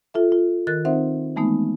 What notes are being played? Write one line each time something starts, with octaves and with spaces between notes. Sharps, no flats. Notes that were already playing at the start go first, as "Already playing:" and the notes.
F4 A4 E5
F4
D#3 A#4 F#6 A6
C4 D#4 C5 E5 F#5
E3 G#3 A3 B3 D#4